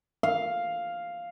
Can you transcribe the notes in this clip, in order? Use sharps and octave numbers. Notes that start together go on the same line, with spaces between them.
F5